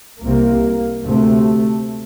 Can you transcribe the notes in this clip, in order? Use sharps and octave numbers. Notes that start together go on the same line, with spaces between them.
C2 C3 A#3
D2 C3 A3